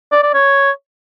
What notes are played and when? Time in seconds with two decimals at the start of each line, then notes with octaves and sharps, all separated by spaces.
0.12 D5
0.23 D5
0.34 C#5